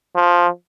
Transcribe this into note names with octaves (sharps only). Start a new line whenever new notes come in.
F3